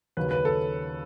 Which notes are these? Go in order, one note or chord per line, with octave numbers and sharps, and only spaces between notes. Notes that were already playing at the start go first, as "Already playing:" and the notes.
D#2 C#3 F#3 C#4 B4
B4
A4